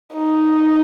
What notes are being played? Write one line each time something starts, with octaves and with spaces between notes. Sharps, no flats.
D#4